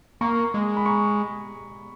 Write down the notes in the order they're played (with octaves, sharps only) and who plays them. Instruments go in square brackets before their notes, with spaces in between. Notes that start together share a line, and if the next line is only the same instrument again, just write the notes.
[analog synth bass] A#3 [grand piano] A#5 C#6
[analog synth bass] G#3
[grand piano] B5
A#5 C#6